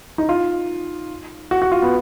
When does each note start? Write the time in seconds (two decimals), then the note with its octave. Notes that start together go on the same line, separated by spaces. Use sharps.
0.18 D#4
0.29 F4
1.51 F#4
1.62 F#4
1.72 F4
1.82 B3